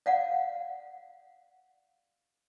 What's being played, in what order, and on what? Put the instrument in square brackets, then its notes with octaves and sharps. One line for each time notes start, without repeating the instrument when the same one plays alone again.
[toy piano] D5 F5 F#5